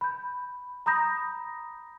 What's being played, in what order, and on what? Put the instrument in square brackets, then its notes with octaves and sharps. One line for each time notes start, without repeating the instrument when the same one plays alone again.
[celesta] B5 G6
A#5 B5 D#6 G6 A#6